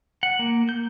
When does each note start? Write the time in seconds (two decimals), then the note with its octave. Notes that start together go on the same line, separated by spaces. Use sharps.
0.23 F#5
0.39 A#3
0.69 G6